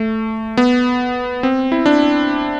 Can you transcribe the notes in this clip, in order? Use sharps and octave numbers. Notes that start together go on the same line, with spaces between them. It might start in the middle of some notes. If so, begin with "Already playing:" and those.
Already playing: A3
B3
C4
E4
D4